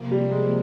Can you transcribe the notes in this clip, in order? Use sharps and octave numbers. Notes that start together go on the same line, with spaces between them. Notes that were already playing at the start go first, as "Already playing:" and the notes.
Already playing: C3 F3 A#3
G3
G#3